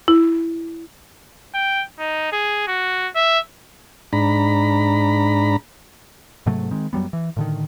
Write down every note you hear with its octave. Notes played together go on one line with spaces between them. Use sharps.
E4
G5
D#4
G#4
F#4
E5
G#2 D4 A#5 B5
G#2 C3 F#3 A3
D#3 G#3 C4
F#2 F#3 G3 B3
E3
A2 D3 D#3